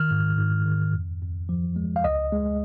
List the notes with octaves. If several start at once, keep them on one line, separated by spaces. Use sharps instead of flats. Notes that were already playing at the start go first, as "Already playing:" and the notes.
Already playing: D#3 F6
G#2
G#2
D#3
F2
F2
F3
G#3
F5
C#2 D#5
G#3